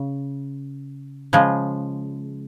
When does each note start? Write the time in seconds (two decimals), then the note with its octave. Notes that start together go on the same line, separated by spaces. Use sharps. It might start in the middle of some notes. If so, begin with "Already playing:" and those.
Already playing: C#3
1.33 C#3 F3 G#3